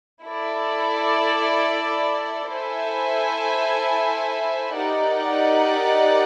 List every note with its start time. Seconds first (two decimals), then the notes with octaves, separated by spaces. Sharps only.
0.23 E4 A4 D5
2.49 E4 A4 C5 E5 G#5
4.75 D#4 G4 A#4 D5 F#5